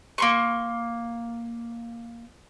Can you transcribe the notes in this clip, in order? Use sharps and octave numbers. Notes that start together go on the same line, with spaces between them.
A#3 C6 C#6